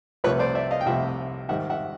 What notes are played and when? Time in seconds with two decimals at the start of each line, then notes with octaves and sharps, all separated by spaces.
0.24 C2 C3 F3 A3 B4 C#5
0.39 C5 D5
0.55 D5 E5
0.71 D#5 F5
0.81 G5
0.85 C2 C3 F3 A3 E5 F#5
1.49 G#2 D#3 G3 E5 F#5
1.70 E5 F#5